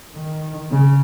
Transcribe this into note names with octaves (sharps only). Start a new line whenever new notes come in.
D#3
C#3